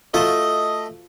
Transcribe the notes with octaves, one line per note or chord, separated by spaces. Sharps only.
A3 F4 F#4 D#5 A5